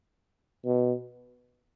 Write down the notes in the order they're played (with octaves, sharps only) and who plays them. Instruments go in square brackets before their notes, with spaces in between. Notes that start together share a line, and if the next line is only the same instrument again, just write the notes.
[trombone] B2